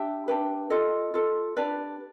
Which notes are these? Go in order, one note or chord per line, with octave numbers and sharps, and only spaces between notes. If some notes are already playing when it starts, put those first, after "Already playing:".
Already playing: D4 G4 E5
D4 G4 B4
F4 A4 D#5
F4 A4
D4 G4 B4 D5